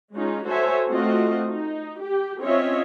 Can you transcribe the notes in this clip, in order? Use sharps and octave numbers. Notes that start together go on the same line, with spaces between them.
G#3 C#4 D#4 F4
F#4 A4 C5 C#5 E5 G#5
A3 C4 F4 F#4 D#5
D#4
G4
C4 C#4 F4 C#5 D#5 E5